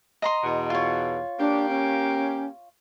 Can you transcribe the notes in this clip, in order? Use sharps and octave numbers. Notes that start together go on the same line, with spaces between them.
D#5 A#5 C6
E2 B2
F4 C#5
A#3 D4 G4
C#4